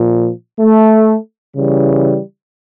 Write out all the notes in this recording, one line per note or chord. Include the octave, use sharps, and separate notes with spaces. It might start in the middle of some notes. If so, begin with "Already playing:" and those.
Already playing: A#2 F3
A3
C#3 E3 G3